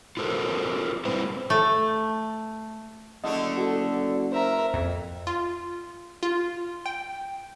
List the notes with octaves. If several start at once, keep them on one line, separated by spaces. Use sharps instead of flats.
F4 F#4 A4 A#4 C5
G3 C4 E4 B4 C5
A3
F#1 D3 A3 D4 D#5
F#4 A4
A#4 C5 E5 A#5
F2
F4
F4
G5